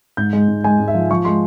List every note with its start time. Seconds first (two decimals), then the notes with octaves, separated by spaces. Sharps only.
0.17 G#2 G6
0.33 G#3
0.48 G#2
0.64 G#3 G#5
0.80 G#2
0.88 E5
0.94 F3
1.10 F3 C#6
1.25 G#3 C6